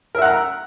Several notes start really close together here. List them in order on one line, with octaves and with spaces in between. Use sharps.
A#4 E5 F#5 A#5